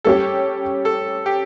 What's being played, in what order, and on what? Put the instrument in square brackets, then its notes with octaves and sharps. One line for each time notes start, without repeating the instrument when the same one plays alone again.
[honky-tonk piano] G3 C#4 G4 [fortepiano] A4
[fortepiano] A4
G4